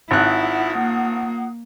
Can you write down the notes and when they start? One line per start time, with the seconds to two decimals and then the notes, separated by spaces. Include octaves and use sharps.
0.11 G#1 E4 F4 F#5 D#6 F#6
0.79 A#3